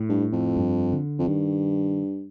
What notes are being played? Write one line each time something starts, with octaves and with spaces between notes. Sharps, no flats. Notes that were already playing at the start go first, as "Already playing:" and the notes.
Already playing: A2
G2
F2
G2
D3
F2
G2 D#3